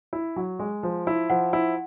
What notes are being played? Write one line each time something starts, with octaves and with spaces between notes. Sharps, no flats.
E4
F#3
G#3
F3
E4
F3 F#5
E4